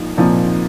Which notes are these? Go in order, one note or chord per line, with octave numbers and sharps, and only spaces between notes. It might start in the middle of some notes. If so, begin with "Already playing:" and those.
Already playing: A#2 F3 D#4
A#2 F3 C4 D#4